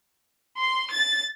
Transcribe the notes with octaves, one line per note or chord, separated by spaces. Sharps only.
C6
A6